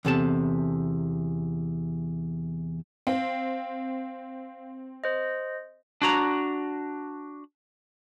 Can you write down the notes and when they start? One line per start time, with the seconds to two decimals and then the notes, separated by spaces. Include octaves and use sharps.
0.05 E2 C3 A4 A5
3.07 C4 F5
5.04 C5 D#5
6.02 D4 F#4 A#5